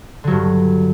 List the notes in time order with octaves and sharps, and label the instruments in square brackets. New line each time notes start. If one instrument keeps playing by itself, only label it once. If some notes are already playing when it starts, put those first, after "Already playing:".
[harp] D3
F#3
G2